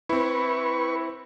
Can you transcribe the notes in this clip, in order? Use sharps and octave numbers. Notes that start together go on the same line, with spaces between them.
C4 E4 B4 C#6